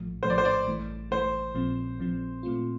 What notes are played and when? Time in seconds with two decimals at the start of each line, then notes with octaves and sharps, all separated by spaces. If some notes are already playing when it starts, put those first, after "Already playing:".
Already playing: A#1 A2 F3 A3
0.23 A#1 A2 F3 A3 C5
0.30 D5
0.38 C5
0.45 D5
0.67 A1 G2 E3 A3
1.11 A1 G2 E3 A3 C5
1.55 A#1 A#2 F3 C4
1.99 A#1 A#2 F3 C4
2.43 A#2 A3 C4 F4